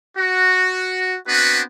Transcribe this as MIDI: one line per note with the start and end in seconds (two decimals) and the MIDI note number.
0.18 1.15 66
1.28 1.62 59
1.28 1.62 60
1.28 1.62 62
1.28 1.62 66
1.28 1.62 71